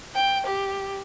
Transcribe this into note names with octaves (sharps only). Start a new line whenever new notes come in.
G5
G4